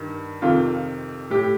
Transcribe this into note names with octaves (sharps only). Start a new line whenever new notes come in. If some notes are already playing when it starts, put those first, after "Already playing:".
Already playing: G2 D#3
F2 C3 D#3 F4
A2 G4